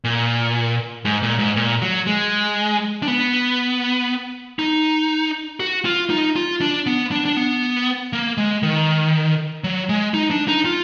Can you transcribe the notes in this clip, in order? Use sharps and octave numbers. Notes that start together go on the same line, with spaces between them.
A#2
G#2
A#2
G#2
A#2
F#3
G#3
D4
B3
D#4
F#4
F4
D#4
F4
D4
B3
D4
D4
B3
A#3
G#3
D#3
F#3
G#3
D#4
D4
D#4
F4